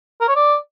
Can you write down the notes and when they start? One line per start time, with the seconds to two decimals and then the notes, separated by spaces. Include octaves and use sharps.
0.21 A#4
0.28 C#5
0.36 D5